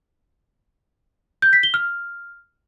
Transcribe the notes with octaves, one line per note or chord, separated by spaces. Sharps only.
G6
B6
G7
F6